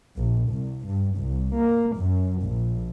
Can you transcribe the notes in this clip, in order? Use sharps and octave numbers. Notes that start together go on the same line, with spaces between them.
A#1
C2
G2
C2
A#3
F#2
A#1